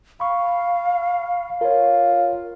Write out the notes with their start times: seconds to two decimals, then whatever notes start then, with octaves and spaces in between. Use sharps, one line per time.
0.20 F5 B5 C#6
1.61 F4 A#4 C#5